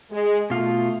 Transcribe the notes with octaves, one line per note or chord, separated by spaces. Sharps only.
G#3
B2 A3 F4